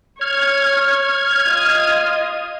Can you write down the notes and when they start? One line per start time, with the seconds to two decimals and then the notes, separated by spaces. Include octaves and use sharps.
0.21 C#5 F6 G#6
1.48 F4 D#5